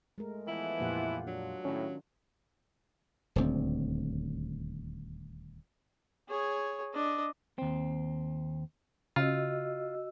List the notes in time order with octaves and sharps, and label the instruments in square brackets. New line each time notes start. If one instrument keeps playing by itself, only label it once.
[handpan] G#3 A3 A#4
[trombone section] E3 F3 B3 [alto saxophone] E4
[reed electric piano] F2 A#2 [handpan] F4 G4 F#5
[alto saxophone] F#3 [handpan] D4
[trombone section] A2 [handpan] D#3 [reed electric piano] C#4
[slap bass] D#1 D2 C4
[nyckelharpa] G#4 C#5
D4 D#5
[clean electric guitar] D#2 C4
[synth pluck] C#3 [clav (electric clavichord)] F4 [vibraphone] F#4 D#5 E6